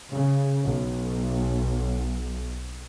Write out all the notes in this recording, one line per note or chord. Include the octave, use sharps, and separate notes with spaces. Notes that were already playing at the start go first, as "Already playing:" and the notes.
C#3
B1